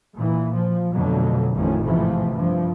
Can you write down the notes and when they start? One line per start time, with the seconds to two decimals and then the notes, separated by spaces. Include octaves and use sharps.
0.15 A#2 E3
0.53 F3
0.94 F2 B2 D3 F#3 A3
1.55 A1 F2 A2 D#3 F3 C#4
1.84 G#2 C3 E3 F3 A3
2.32 G2 F3